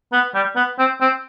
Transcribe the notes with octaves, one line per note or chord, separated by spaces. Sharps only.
B3
G3
B3
C4
C4